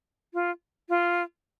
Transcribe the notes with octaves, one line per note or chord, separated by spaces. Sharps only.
F4
F4